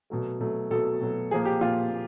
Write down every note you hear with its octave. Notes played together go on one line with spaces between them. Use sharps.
B2 F#3 A3
B2 F#3 A3
B2 F#3 A3 A4
B2 F#3 A3
A#2 F3 A#3 G#4
G4
A#2 F3 A#3 F4
A#2